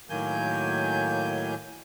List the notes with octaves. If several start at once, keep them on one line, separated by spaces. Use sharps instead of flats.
A2 D#3 F#3 A#3 G#5 G6